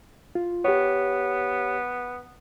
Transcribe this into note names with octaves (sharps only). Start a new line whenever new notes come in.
F4
B3 G4 C#5